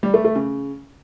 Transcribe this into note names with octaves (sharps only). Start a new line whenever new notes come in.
G3
A3
A3
C#3